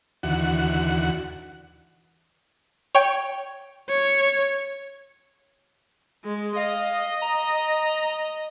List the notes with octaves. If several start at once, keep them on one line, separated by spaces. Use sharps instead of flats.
D#2 D3 E3 F#4 F#5
C#5 G5
C#5
G#3
D#5 F5
A#5